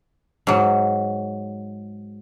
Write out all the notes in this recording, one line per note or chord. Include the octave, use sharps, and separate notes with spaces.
G#2 F#3